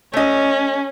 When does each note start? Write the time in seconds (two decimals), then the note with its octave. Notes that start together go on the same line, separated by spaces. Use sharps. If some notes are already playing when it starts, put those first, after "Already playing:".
0.13 A3 C#4 D#5